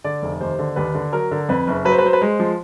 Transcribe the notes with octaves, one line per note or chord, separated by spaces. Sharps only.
D3 D5
F1
D#2 C5
D3
D#2 B4
D3
F#3 A#4
D3
F2 B4
F#1
F#3 B4
C5
B4
F#3 C5
B4
G#3 C5
F3